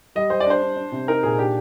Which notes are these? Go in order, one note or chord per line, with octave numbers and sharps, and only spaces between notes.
G3 D#5
G3 C5
D5
D4 C5
D4
D4
C3
D#4 A#4
A#2 G#4
D4 G4